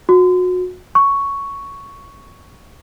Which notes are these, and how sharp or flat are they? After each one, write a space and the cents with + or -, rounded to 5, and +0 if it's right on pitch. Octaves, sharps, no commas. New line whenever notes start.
F#4 -30
C#6 +5